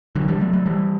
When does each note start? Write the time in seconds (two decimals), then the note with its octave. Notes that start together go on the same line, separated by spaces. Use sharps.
0.16 D3 F#3
0.28 E3 G3
0.41 F#3 A3
0.53 F#3 A3
0.66 E3 G3